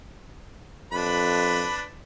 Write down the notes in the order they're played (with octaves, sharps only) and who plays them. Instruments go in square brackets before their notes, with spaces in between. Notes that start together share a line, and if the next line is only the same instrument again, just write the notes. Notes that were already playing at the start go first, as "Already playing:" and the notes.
[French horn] F2 [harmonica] D4 B4 B5